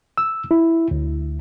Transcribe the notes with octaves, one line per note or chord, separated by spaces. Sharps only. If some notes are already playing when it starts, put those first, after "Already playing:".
E6
E4
D2